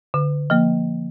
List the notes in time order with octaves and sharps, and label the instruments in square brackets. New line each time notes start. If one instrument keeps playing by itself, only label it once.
[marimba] D3
F3 A#3